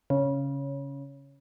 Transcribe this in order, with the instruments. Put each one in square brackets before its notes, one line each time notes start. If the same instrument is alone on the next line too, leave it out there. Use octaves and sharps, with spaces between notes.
[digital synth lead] C#3